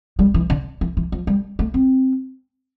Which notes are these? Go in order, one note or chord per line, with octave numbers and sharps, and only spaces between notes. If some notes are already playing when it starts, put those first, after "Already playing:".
G3
E3
D3
E3
E3
F3
G3
A3
C4